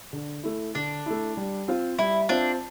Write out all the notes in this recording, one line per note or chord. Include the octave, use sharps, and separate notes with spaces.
D3
A3 E4
D3 D4
A3 E4
G3
C4 F4 C5 F5
G3 E4
C4 D4 F4 C5 F5